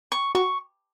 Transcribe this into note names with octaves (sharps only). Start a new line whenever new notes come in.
C#6
F#4 C#6